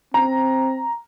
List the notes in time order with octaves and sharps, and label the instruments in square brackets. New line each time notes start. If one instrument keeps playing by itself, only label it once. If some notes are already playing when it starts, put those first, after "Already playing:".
[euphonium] C4 [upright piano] A#5